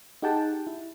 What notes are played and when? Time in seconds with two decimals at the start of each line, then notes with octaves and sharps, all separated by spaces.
0.22 D#4 G4 G#4 F#5 G5 A5
0.67 E4